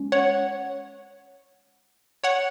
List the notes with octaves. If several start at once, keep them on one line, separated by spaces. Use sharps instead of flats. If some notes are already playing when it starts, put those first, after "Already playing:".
Already playing: G#3 C#4
C#5 F#5
C#5 F#5